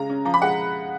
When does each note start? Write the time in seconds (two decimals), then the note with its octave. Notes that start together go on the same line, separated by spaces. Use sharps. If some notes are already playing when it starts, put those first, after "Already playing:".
Already playing: C#3 G#3 A#5
0.10 C#4
0.25 F3 A#5
0.34 B5
0.42 G#3 F#5